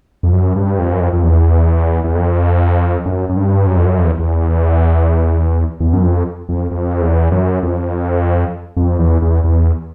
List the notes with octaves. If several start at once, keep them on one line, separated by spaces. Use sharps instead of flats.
F2
F#2
G2
F2
F#2
F2
F2
E2
E2
F2
F#2
F#2
G2
F#2
F2
F#2
F2
E2
E2
E2
F#2
F2
F2
F2
E2
F#2
F2
F2
E2
E2
E2